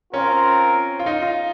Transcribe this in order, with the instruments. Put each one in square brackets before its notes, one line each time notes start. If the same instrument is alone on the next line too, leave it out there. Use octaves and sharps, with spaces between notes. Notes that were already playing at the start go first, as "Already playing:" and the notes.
[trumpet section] C4 F4 A#4 [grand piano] C#4
[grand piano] F4
D#4
F4